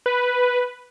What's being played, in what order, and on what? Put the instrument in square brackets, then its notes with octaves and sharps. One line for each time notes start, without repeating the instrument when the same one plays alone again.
[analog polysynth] B4